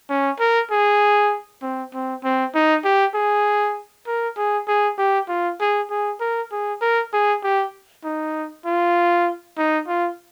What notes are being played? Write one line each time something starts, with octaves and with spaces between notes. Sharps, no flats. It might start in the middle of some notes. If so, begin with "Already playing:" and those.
C#4
A#4
G#4
C4
C4
C4
D#4
G4
G#4
A#4
G#4
G#4
G4
F4
G#4
G#4
A#4
G#4
A#4
G#4
G4
D#4
F4
D#4
F4